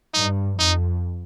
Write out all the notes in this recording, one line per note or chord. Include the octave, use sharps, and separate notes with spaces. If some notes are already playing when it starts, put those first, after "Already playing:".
G2 D#4
F2 D#4